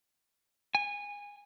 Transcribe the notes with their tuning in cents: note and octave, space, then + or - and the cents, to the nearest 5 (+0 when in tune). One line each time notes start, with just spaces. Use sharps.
G#5 -20